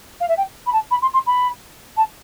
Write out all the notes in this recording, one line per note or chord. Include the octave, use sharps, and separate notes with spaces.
F5
E5
G5
B5
A5
B5
C6
C6
B5
A5